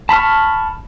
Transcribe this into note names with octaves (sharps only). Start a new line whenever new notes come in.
A5 B5 C#6 F6